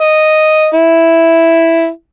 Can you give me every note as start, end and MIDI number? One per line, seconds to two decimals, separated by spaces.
0.01 0.67 75
0.74 1.88 64